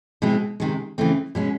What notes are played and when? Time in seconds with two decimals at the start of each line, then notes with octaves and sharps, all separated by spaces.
0.22 B2 G#3 C4 E4
0.60 C3 D#3 G#3
0.98 C#3 E3 A3 C4
1.35 B2 G#3 C#4